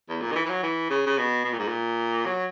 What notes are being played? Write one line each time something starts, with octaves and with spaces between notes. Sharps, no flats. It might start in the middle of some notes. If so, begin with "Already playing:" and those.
E2
A#2
D#3
E3
E3
F#3
E3
C#3
C#3
B2
B2
A#2
G#2
A#2
F#3